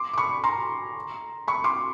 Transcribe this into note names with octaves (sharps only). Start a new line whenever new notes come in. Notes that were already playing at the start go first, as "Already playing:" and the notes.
Already playing: C6 D6
D6
B5 C#6
A#5 C6
B5 C#6
C6 D6